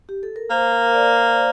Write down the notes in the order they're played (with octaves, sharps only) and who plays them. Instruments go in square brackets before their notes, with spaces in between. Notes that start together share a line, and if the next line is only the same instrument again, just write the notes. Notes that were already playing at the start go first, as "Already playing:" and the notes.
[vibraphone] G4
A4
A#4
[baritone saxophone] A#3 [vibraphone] C5
[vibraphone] A#4
D5
C5